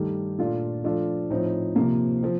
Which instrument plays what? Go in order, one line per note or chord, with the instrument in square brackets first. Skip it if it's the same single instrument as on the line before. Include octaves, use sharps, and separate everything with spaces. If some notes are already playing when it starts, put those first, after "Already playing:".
Already playing: [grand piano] G2 D#3 A3 D#4 G4
A#2 A3 D4 F4
F3 A3 D4 F4
A2 F3 C4 D#4
C3 F3 A#3
F3 C4